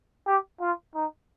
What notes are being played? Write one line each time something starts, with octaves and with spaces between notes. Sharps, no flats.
G4
F4
D#4